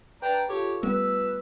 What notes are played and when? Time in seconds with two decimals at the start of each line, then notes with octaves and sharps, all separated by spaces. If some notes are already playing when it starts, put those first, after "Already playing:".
0.22 D4 B4 G5 A#5 A6
0.49 F4 G4 A4 C#5
0.83 G3 A3 B3 B4 E6